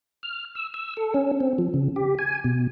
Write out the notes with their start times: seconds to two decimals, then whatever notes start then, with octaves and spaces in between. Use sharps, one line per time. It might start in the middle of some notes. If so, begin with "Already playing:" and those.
0.23 F6
0.55 E6
0.74 E6
0.97 A4
1.14 C#4
1.40 C4
1.58 F3
1.74 C#3
1.96 G4
2.19 G#5
2.44 B2